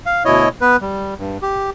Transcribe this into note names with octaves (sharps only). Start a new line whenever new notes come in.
F5
D2 B2 E4 C#5 D#5
B3 B4
G3
G2
G4